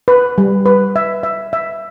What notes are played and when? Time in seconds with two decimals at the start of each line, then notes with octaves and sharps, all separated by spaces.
0.08 B4
0.38 G3
0.66 B4
0.96 E5
1.23 E5
1.53 E5